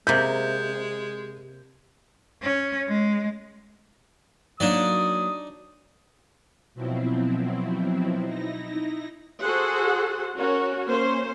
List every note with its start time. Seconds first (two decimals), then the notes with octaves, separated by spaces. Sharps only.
0.07 C3 G#3 A#3 B5 G6
2.43 C#4
2.88 G#3
4.60 F#3 A#3 D4 D#4 D5 D#6
6.74 B2 F3 F#3 C4 E4
8.25 D#4 E4 A#6
9.44 F#4 G#4 A4 C5 F#5
10.36 C#4 F#4 A#4 C#5
10.88 A#3 C#4 C5